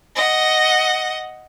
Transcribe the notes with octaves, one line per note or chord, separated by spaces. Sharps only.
D#5 F#5